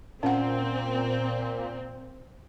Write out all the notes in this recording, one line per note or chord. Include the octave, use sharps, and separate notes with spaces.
A#2 C4 C#4 F#5